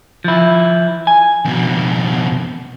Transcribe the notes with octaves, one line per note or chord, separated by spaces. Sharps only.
F3 E4
G#5
F2 B2